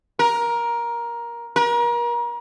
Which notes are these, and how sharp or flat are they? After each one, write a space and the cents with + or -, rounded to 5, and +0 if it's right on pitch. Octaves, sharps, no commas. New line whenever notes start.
A#4 +15
A#4 +35